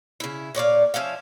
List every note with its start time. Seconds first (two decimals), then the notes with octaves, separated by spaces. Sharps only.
0.20 C#3 E4
0.55 A#2 C#5 D5 F5
0.94 F3 C#4 E5 F5